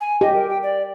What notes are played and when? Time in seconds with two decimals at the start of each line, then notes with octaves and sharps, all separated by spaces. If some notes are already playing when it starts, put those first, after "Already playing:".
0.01 G#5
0.21 G4 D#5
0.34 A#4
0.50 G5
0.63 D5